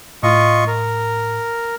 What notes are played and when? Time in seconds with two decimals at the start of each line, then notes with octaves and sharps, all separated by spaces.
0.23 A2 F4 D#5 C#6
0.67 A#4